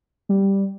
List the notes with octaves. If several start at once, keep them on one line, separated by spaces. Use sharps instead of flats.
G3